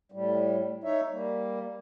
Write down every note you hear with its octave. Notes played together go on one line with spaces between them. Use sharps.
A2 G3
D#4 C#5 E5
G3 A#3